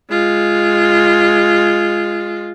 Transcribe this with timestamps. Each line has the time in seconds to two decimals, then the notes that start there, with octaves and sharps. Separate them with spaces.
0.10 G#3 F4